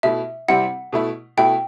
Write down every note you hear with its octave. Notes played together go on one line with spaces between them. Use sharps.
B2 A3 E4 E5
C3 G3 C4 E4 F#5
B2 A3 E4
B2 A3 E4 G5